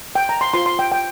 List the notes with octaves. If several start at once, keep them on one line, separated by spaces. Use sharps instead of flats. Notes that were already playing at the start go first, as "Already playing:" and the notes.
G5
A#5
C6
F4 C5 C6
C6
G5
G5